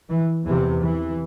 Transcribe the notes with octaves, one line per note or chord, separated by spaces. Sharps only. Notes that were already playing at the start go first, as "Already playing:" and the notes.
E3
E2 C3 E3
E3